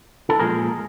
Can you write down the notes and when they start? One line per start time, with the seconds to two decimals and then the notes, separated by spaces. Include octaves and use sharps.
0.30 A4
0.39 A#2 F3 G#3 G#4 A#4